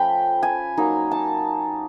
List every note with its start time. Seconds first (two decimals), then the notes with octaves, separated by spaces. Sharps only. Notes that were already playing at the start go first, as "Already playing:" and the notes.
Already playing: F3 A3 C#4 G5 B5
0.43 G#5
0.77 F#3 A#3 D#4
1.11 A5